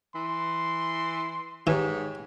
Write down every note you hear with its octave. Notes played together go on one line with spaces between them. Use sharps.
E3 C6
G#2 E3 G4 C#5 G#5